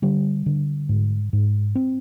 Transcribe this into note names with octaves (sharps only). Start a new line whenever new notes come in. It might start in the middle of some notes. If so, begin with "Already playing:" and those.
D3 G3
D3
G#2
G#2
C4